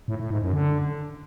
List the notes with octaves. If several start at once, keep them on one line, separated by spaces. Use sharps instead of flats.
A2
A2
G#2
F#2
D3